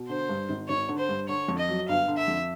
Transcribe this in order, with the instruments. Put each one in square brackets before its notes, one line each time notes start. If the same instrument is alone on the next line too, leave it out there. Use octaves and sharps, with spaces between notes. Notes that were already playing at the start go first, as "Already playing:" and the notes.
Already playing: [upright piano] B2
[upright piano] D3 [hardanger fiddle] C5
[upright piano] G2
G#1
[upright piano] G#1 [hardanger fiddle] C#5
[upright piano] D3
[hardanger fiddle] C5
[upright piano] G2
[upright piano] D3 [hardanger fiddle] C#5
[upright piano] F2
[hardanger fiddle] D#5
[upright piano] F#3
[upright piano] G1 [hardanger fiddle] F5
[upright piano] D3
[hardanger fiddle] E5
[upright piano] F2